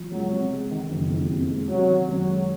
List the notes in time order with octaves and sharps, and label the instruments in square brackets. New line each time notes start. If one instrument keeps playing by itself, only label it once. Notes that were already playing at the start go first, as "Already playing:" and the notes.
Already playing: [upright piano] F3
[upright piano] C#2 [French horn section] F#3
[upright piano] C3
G#3
D#3
F#1
F2
C3
G#3
[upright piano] C3 [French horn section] F#3
[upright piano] D#3
[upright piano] F#2 [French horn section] F#3
[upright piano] G#3